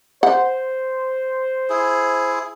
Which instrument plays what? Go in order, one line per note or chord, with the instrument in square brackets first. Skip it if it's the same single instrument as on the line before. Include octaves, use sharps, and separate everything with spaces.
[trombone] C5 [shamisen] F#5
[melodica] E4 G#4